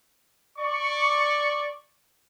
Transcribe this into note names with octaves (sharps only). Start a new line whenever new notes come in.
D5 C#6